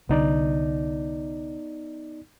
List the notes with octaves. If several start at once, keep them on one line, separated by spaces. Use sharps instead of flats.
C2 D3 B3 D#4 D5